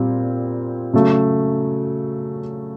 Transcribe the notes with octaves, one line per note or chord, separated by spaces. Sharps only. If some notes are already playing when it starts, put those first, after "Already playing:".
Already playing: A#2 G3 C4
C#3 F#3 A3